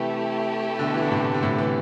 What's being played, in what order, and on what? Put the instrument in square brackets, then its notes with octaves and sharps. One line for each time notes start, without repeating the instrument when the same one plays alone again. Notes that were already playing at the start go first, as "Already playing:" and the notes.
Already playing: [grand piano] C3 E3 [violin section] A3 E4 G4
[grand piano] B2 D3
E3
D3
A2 C3
D3
A2 C3
C3 E3